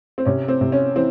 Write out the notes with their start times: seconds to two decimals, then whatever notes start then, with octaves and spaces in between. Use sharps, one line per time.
0.18 C4
0.25 C3 C#4
0.48 C4
0.61 C3
0.72 C#4
0.95 E3 C4